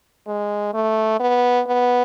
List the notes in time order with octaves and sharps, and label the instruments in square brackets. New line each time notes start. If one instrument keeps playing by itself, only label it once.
[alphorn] G#3
A3
B3
B3